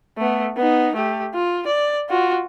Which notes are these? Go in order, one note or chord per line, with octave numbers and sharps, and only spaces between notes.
A3 B3
B3 D#4
A3 G4
F4
D5
F4 F#4